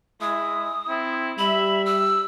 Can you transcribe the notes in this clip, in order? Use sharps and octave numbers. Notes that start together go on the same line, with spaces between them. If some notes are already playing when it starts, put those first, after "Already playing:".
G#3 E4 D#6
C4 E4
G3 E5 B5
E6